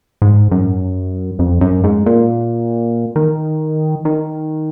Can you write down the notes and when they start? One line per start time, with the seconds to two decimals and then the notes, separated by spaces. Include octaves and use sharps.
0.22 G#2
0.51 F#2
1.39 F2
1.61 F#2
1.84 G#2
2.06 A#2
3.16 D#3
4.05 D#3